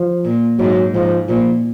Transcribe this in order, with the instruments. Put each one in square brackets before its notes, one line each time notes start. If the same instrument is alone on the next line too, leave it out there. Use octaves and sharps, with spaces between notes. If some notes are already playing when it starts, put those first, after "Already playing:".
Already playing: [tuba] F3
[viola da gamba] A#2
[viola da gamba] G#2 [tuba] F#3
[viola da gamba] G#2 [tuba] F3
[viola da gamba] A#2 [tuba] F3